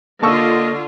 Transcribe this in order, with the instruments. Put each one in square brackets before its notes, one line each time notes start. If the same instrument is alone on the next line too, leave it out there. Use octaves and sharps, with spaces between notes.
[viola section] D3 F4 [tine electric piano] A#3 [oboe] D#5 [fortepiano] A5 C#6 E6